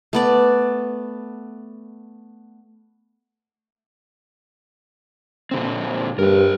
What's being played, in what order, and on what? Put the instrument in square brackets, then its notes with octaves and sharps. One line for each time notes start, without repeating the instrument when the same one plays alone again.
[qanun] A3 B3 D5
[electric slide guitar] A#2 D3 C4
[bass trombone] G2 [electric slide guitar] A#4 C5